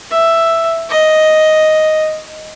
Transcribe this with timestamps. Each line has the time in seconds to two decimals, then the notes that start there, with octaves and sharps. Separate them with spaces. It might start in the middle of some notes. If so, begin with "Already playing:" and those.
0.11 E5
0.90 D#5